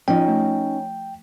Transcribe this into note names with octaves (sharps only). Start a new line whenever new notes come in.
F3 C#4 D#4 F4 G5
A3